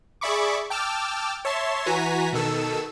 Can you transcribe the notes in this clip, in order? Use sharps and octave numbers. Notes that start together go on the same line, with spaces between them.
G#4 D5 E5 B5 C#6 D6
G5 A5 D6 E6 F6
C#5 E5 A5 C6
E3 F#4 G#5 A#5 B6
B2 D#3 A4 E6